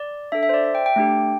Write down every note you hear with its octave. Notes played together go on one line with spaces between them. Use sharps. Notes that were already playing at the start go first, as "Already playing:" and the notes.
Already playing: D5
D4 A4 E5
E5
C5
D5
E5
G5
G5
A3 D4 G4